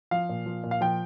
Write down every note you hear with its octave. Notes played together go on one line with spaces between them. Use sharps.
F3 F5
A#2
F3
A#2
F5
F3 G5